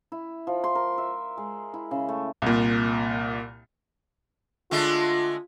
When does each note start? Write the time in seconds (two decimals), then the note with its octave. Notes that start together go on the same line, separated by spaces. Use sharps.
0.12 E4
0.47 F3
0.64 C6
0.75 A#4
0.98 E5
1.37 G#3
1.74 E4
1.91 C#3
2.09 A3
2.42 C2 A#2
4.71 D3 G#3 A3 F4